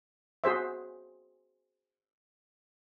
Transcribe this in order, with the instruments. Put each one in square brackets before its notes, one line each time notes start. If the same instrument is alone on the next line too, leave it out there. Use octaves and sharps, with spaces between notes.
[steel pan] F#4 G#4 C5 E5